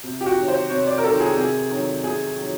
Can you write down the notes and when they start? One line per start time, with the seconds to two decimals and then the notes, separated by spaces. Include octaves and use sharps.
0.03 C3
0.21 G4
0.26 F#4
0.36 D#3 F#3
0.48 C5
0.70 C3 C#5
0.87 D5
0.98 A#4
1.04 D#3 F#3 A4
1.20 G#4
1.37 C3 G#4
1.71 D#3 F#3
2.04 C3 G#4
2.38 D#3 F#3